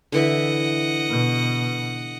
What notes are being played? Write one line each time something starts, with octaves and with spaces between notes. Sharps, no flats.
D3 E3 D#5 E5 F#5
B2